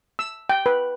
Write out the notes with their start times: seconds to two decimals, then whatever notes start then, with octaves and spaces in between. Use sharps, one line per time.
0.19 E6
0.49 G5
0.66 B4